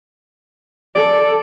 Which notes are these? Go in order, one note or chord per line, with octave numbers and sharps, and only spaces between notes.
A4 D5